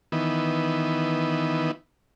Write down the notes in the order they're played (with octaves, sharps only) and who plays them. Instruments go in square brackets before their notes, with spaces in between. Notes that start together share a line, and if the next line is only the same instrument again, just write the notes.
[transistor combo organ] D#3 E3 B3